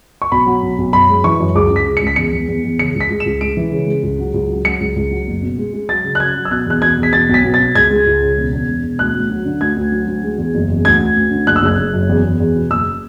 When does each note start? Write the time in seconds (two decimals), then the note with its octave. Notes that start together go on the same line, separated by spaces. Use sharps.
0.22 C#6
0.32 B1 B5
0.46 F#3
0.63 B1
0.78 B1
0.93 F#2 B5
1.09 G#3
1.24 E3 C#6
1.40 F#2
1.55 C#2 D6
1.70 C#2
1.76 B6
1.86 C#3
1.97 C#7
2.02 C#2 B6
2.16 E2 C#7
2.33 E2
2.48 E2
2.64 E2
2.79 C#3 C#7
2.95 C#2
3.01 B6
3.10 C#2
3.20 E7
3.26 C#2
3.41 G#3 D7
3.57 E3
3.72 C#3
3.87 G#3
4.03 C#2
4.19 F#3
4.34 C#2
4.49 F#3
4.65 F#3 C#7
4.80 C#2
4.96 C#2
5.11 F#3
5.28 F#1
5.42 B2
5.58 G#3
5.74 G#3
5.89 F#3 A6
6.04 C#3
6.15 F#6
6.20 F#3 G#6
6.36 F#3
6.45 E6
6.51 B2 F#6
6.66 E2 F#6
6.82 B2 G#6
6.98 E2
7.03 B6
7.13 B2 A6
7.29 B1
7.34 B6
7.44 B2
7.54 A6
7.60 B2
7.75 C#2 G#6
7.90 G#3
8.07 C#2
8.22 C#3
8.37 E1
8.52 E1
8.68 E1
8.83 E1
8.99 D2 F#6
9.14 D2
9.30 F#3
9.45 D3
9.61 D2 G#6
9.77 D2
9.92 F#3
10.07 D2
10.23 G#3
10.38 E2
10.55 F#1
10.70 E2
10.85 D2 G#6
11.01 D2
11.16 D2
11.31 D3
11.47 F#1 F#6
11.56 E6
11.62 F#1 F#6
11.78 F#1
11.94 F#2
12.09 E2
12.24 E2
12.40 E2
12.55 B2
12.71 F#1 E6